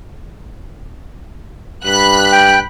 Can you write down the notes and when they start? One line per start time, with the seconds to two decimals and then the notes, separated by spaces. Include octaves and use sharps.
1.85 G2 B5 F#6
2.32 G5